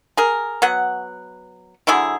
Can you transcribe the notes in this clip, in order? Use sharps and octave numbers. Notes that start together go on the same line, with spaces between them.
G#4 A#4
F#3 B3 F#5
D3 F#3 E4 G#4